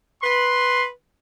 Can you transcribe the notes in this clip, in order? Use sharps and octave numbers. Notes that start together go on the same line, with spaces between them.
B4 C6